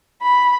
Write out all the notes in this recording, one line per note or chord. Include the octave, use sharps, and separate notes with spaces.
B5